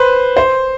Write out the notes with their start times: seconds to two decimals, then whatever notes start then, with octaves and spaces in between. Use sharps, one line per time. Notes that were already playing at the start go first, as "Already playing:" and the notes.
Already playing: B4 C5
0.37 C5